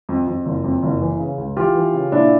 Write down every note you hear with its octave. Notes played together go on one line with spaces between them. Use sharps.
F2
F2
F#1
F2
F#1
E3
C#3
C#2
E3 F4 G4
E3
C#3
A#2 D4 E4